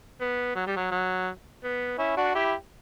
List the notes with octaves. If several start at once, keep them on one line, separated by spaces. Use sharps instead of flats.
B3
F#3
G3
F#3
F#3
B3
C#4 E4
D4 F#4
E4 G4